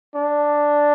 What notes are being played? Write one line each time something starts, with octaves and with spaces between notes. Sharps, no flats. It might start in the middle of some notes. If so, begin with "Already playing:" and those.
D4